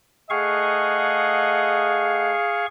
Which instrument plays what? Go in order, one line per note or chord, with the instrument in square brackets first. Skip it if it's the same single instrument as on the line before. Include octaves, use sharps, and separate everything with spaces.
[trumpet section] A3 D#5 F#5 [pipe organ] G#4 F5 C#6